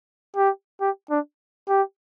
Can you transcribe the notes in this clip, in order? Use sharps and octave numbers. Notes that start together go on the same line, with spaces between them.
G4
G4
D4
G4